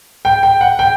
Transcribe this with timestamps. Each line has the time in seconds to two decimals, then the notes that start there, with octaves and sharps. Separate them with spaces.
0.25 G5
0.43 G5
0.61 F#5
0.79 G5